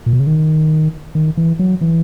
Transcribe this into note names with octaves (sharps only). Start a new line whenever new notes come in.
A#2
B2
C#3
D#3
D#3
E3
F#3
E3